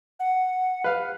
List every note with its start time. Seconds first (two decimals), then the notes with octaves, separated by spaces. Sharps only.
0.20 F#5
0.84 B4 F5